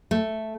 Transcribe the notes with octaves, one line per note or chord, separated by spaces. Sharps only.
A3